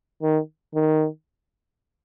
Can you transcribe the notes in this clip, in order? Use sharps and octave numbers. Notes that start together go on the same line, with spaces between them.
D#3
D#3